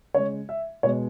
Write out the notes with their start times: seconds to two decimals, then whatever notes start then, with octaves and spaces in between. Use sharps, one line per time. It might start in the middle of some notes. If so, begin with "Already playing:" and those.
0.14 C#3 G#3 C#5
0.49 E5
0.83 B2 G#3 C#5